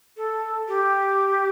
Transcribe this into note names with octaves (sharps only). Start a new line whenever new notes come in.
A4
G4